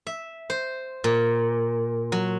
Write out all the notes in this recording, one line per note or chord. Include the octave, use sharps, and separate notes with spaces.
E5
C5
A#2
F#3